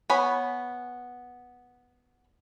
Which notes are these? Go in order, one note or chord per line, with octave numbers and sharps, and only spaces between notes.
B3 C#5 G#5 B5